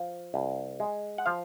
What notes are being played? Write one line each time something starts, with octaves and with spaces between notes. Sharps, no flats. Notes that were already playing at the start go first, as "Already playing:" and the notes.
Already playing: F3
C2
G#3
F#5
F3 F5